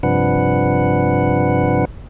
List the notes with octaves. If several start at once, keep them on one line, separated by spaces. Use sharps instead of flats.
G2 C3 F3 D4 B4 F#5